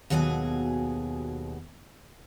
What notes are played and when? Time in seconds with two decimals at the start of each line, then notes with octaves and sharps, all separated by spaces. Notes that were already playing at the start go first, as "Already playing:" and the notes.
0.10 D#2 B2 F#3 G#4 A#4 G#5